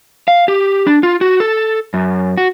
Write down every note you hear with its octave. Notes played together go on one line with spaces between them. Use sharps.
F5
G4
D4
F4
F#4
A4
F#2
F#4